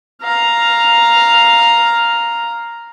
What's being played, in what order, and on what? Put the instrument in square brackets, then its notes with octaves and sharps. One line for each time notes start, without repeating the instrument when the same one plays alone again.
[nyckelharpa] F5 A#5